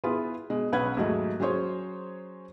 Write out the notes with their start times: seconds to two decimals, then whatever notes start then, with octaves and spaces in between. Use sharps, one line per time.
0.04 B3 E4 F4 G#4 B4
0.50 B2 G#3
0.72 B1 C#4 B4 F#5 G#6
0.97 D#2 G#2 F#3 G#3 A3
1.40 F#3 C#4 G#4 C5 C#5